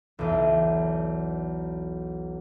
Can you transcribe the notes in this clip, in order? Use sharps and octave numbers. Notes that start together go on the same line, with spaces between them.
B1 E2